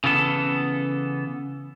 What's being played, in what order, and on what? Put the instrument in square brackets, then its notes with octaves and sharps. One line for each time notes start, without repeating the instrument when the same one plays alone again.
[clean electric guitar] C#3 E3 B3 A4